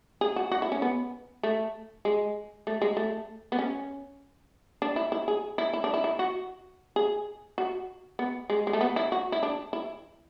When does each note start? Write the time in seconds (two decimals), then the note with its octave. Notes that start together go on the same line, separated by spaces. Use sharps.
0.21 G#4
0.36 F#4
0.52 F#4
0.62 E4
0.72 C#4
0.82 B3
1.43 A3
2.05 G#3
2.67 A3
2.82 G#3
2.97 A3
3.52 B3
3.59 C#4
4.82 D4
4.96 E4
5.12 E4
5.28 G#4
5.58 E4
5.73 E4
5.84 D4
5.94 E4
6.04 E4
6.19 F#4
6.96 G#4
7.58 F#4
8.19 B3
8.50 G#3
8.67 G#3
8.73 A3
8.81 B3
8.96 E4
9.12 F#4
9.32 E4
9.43 D4
9.73 E4